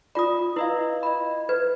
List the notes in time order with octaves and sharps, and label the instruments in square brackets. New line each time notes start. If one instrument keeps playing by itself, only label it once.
[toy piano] F4 D5 [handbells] B5 D#6
[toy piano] E4 [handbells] B4 D#5 F5
[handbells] D#5 B5
[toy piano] B4 [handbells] G#6